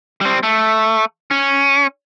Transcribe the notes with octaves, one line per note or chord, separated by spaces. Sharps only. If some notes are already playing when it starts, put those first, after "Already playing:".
G3 C4
A3
C#4